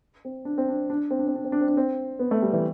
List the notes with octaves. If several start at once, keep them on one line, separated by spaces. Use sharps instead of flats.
C4
D4
C4
D4
D4
C4
D4
C4
D4
C4
D4
C4
D4
C4
B3
A3
G3
E3